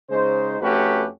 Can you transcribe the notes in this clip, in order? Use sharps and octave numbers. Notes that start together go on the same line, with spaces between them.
C#3 G#3 D#4 C5
F2 A3 C#4 F#4 G4 B4